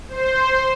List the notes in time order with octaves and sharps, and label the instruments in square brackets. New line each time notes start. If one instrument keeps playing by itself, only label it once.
[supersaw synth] C5